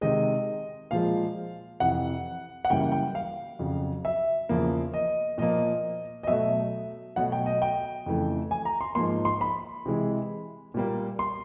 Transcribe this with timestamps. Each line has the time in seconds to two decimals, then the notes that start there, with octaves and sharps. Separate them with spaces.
0.01 C3 D#3 G#3 D#5
0.91 A#2 F3 G#3 F5
1.80 F2 C3 E3 F#5
2.65 F#5
2.70 F#2 C#3 E3 G3 A#3 G5
2.92 G5
3.15 F5
3.59 F2 C#3 F#3
4.05 E5
4.49 E2 C#3 F3 A#3
4.94 D#5
5.38 A#2 F3 A#3 D#5
6.23 D#5
6.27 B2 F#3 A3 E5
7.16 B2 F#3 A3 F#5
7.32 G5
7.46 D#5
7.62 G5
8.06 F2 C#3 E3 A3
8.51 G#5
8.65 A#5
8.81 C6
8.95 G#2 F3 A#3 C6
9.25 C6
9.41 B5
9.86 C3 E3 G#3
10.74 A#2 G3 A#3
11.19 C6